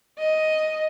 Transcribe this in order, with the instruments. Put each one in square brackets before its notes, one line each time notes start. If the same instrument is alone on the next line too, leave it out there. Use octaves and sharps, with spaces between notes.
[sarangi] D#5